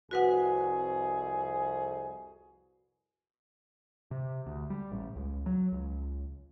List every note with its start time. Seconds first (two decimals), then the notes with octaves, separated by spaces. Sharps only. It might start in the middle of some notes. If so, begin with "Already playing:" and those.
0.11 C2 F2 F#4 G#4 B4 F#5
4.11 C3
4.47 D2
4.70 G3
4.92 A1
5.16 C#2
5.46 F#3
5.72 C#2